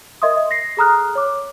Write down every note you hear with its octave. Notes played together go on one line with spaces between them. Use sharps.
A#4 D#5 E5 C6 D#6
A#6 C7
G#4 A4 A#5 D#6 F6 F#6
C#5 D6